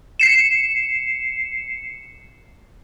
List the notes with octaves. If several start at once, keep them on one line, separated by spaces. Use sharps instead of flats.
C7 C#7 E7